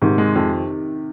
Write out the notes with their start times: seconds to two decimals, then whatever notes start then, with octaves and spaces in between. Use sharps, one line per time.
0.02 G#2 C3 D#3
0.18 G#3
0.36 F2